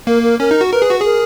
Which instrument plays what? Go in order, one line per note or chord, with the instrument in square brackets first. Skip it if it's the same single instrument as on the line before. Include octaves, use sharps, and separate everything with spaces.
[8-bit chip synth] A#3 [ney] A#4
[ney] A#4
[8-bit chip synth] C#4 [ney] A#4
[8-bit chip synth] D#4
F#4
[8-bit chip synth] A#4 [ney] B4
[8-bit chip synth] G#4
F#4
[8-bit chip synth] G#4 [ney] A#4